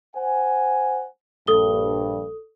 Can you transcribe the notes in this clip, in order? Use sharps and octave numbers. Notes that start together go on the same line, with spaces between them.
C5 F#5 G#5
A#1 G2 A4 D#6 G7